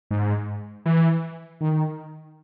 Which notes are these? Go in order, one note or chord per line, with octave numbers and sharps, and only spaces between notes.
G#2
E3
D#3